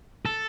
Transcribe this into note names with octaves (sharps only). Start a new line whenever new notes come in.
A4